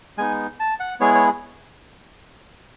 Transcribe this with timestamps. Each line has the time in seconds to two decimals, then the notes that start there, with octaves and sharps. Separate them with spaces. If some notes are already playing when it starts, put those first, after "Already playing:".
0.18 G#3 B3 D#4 G#5
0.60 A5
0.80 F#5
1.00 G#3 B3 E4 G#4 C#5
1.15 C#5